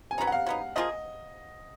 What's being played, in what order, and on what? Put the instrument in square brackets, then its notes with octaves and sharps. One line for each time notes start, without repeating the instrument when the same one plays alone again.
[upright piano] G#5
[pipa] F#3 B3 D#4 [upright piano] A#5
[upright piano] F#5
F5
[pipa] F#3 B3 D#4
[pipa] F3 A#3 F4 G#4 [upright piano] D#5